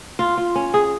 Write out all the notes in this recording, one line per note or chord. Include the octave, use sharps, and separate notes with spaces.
F4
F4
C#4
G#4